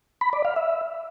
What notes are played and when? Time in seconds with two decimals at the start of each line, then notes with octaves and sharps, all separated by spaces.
0.21 B5
0.33 D5
0.45 F5
0.56 E5